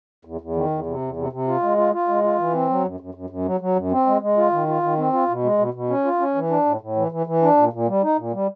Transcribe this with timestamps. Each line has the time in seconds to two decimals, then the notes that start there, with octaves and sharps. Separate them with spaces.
0.25 E2
0.41 E2
0.56 D#3
0.71 E2
0.86 C3
1.01 E2
1.16 C3
1.32 C3
1.48 F4
1.62 G#3
1.78 F4
1.93 F4
2.08 G#3
2.24 F4
2.38 E3
2.54 C4
2.69 F#3
2.84 F#2
3.00 F#2
3.14 F#2
3.30 F#2
3.45 F#3
3.60 F#3
3.76 F#2
3.91 C4
4.06 G#3
4.22 G#3
4.37 F4
4.52 D#3
4.68 F4
4.83 D#3
4.98 C4
5.13 F4
5.28 B2
5.44 G#3
5.59 B2
5.74 B2
5.90 C#4
6.05 F4
6.20 C#4
6.35 E3
6.50 D4
6.65 A2
6.81 A2
6.96 E3
7.12 E3
7.27 E3
7.42 D4
7.57 A#2
7.73 A#2
7.88 G3
8.03 D#4
8.18 A#2
8.33 G3